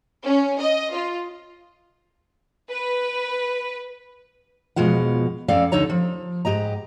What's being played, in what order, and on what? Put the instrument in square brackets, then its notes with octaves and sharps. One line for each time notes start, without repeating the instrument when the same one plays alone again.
[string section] C#4
D#5
F4
[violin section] B4
[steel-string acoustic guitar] E2 B2 F3 G#3 F4 F#5
F2 C4 C#4 A4 D5 F5
D#2 D3 D#4 A4 C#5 A#5
F3
G#2 G4 D#5 A#5